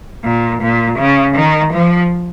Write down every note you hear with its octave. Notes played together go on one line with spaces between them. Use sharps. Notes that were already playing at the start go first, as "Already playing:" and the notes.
A#2
A#2
C#3
D#3
F3